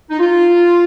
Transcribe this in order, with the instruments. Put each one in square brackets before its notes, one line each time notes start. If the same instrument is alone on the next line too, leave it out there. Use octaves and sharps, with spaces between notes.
[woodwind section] D#4
F4